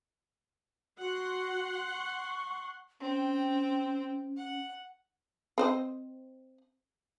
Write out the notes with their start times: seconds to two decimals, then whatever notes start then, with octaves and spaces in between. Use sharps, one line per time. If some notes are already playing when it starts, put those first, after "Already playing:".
0.98 F#4 F#5 C6
1.94 C#6
3.00 C4 C#4 G5
4.37 F#5
5.58 C4 C5 D#5